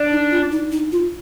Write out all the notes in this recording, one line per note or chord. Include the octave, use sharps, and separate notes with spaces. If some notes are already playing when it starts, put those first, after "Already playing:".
Already playing: D4
D#4
F4
D#4
D#4
F4